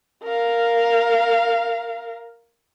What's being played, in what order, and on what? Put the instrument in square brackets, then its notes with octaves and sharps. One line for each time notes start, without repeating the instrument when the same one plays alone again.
[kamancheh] A#4 F5